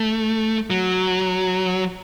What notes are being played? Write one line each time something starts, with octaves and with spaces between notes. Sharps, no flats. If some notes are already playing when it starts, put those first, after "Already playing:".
Already playing: A3
F#3